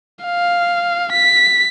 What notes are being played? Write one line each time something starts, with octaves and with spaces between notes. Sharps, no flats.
F5
B6